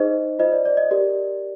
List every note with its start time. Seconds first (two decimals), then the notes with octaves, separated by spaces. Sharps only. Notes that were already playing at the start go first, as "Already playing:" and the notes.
Already playing: D#4 G#4 C5 D#5
0.39 F4 C5 D#5
0.52 D5
0.65 D5
0.77 D#5
0.91 G4 A#4 D5